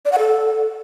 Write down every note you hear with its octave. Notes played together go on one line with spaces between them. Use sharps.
D5
F#5
A4